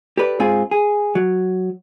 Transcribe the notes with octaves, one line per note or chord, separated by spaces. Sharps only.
G4 A4 B4 D5
G#2 C4 F4 G#4
G#4
F#3